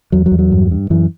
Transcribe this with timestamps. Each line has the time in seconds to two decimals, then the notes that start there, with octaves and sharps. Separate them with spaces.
0.12 E2 F#3
0.26 F#3
0.31 E2
0.39 F#3
0.52 G2
0.71 G2
0.90 F#2 E3